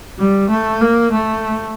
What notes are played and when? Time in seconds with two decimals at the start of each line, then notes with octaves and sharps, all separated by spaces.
0.19 G3
0.49 A3
0.81 A#3
1.12 A3